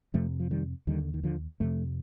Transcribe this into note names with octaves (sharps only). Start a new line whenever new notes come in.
F2 C3 F3 A3
F3
D#3 G3
D#2 D3 D#3 G3
D#3
D3 F3
F2 C3 F3 A3